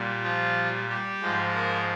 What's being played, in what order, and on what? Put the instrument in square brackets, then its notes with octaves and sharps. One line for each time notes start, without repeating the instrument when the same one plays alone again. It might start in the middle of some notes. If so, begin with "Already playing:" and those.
Already playing: [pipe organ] A#2 G3
F3 F4
G3 G4
G#2 F3 G#3
A#3 A#4